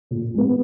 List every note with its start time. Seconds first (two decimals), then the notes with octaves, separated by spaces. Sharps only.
0.11 A#2
0.34 G#3 B3